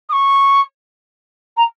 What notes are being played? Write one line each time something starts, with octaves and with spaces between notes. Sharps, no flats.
D#6
C#6
A#5